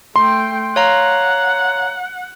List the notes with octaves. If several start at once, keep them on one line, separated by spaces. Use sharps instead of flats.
A3 G5 C6
C#5 F5 F#5 A#5